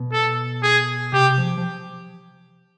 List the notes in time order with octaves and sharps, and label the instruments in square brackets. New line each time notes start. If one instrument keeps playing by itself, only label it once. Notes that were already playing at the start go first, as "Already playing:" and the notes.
Already playing: [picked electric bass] B2
[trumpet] A4
G#4
[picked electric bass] C3 [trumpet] G4
[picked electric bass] F3
F3